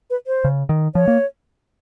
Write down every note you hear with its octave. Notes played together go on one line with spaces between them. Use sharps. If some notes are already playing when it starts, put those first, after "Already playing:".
B4
C5
C#3
D#3
F3 C#5
A#3